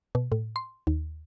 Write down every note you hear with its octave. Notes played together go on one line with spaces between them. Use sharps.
B2
A2
C6
D#2